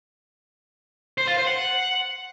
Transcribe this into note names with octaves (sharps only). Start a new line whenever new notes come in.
C5
F4
C5
F#5